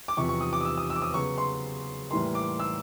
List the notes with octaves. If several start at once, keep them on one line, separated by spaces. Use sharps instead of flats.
D6
E2 C3 F3 C#6
C#6
D#6
D6
D#6
E6
D#6
E6
D6
D#6
C#3 F#3 B3 C#6
C6
A2 E3 G3 A#3 C6
D6
E6